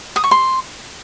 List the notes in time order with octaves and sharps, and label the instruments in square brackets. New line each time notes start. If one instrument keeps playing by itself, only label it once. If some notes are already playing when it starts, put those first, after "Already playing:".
[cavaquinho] D#6
C#6
C6